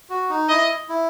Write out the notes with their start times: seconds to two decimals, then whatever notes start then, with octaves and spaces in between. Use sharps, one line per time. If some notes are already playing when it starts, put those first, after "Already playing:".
0.10 F#4
0.30 D#4
0.49 E4 D#5
0.89 E4